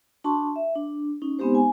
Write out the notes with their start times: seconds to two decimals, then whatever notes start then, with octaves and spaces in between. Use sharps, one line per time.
0.24 D4 F#4 A5 C6 C#6
0.56 E5
0.76 D4
1.22 C#4 D#4
1.39 G#3 B3 C4 D#4 G4 C5
1.55 G#5